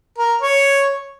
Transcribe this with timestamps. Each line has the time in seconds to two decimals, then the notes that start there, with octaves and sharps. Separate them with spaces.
0.18 A#4
0.41 C#5